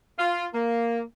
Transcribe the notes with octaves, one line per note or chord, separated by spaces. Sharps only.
F4
A#3